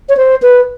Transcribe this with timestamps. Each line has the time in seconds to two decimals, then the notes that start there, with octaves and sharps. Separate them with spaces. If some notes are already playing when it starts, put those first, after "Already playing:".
0.09 C#5
0.17 C5
0.42 B4